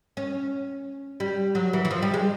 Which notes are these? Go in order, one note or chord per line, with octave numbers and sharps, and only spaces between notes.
C#4
G3
F#3
E3
E3
F3
G3
G#3